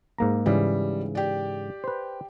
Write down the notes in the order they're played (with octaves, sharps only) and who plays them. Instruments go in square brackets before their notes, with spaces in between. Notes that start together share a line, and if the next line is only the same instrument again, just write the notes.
[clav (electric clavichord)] G#2 A#3 A#5
[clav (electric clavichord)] G#2 C#3 E3 [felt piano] G3
[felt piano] G4 D5
[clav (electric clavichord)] B4 C5